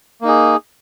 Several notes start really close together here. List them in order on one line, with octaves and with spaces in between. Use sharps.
A#3 D#4 G#4